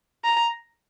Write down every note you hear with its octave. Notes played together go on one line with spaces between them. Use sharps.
A#5